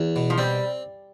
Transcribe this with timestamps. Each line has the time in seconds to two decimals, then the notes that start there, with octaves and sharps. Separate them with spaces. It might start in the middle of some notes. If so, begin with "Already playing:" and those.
Already playing: E2
0.16 B2
0.30 F3
0.38 G3 C4